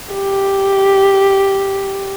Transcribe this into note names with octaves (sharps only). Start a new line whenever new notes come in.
G4